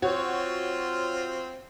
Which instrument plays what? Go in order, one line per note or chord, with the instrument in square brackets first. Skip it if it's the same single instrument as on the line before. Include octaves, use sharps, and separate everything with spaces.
[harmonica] C4 F4 [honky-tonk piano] F#4 C#5